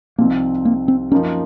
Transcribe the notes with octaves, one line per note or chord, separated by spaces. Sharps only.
C2 C3 F3 A#3 C4 D#4
A#3
C4
F#2 F3 A#3 C#4 D#4